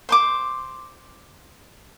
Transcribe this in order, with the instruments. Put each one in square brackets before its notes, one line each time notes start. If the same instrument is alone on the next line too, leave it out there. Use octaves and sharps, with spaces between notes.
[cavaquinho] C5 C6 D6